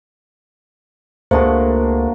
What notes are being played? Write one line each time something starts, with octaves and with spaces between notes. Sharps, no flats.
C#2 A3 A#3 D4 F#4 G#4 C5